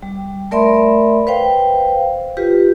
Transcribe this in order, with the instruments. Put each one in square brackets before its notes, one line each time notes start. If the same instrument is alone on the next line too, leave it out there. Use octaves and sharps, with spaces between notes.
[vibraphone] G3
A3 A#4 D5 E5 B5 C6
B4 C5 F5 G5
F4 G4 B4